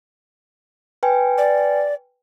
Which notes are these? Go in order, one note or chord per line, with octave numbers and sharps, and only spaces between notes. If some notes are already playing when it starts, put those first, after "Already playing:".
B4 G5 G#5
D5